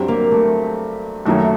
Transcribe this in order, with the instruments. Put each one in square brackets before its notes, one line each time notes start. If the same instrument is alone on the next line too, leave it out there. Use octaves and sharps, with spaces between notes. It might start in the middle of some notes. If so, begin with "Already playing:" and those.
Already playing: [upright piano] G2 F#3 C4 G4
[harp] A#3
A3
[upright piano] F#2 D#3 F#3 A#3 [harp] A3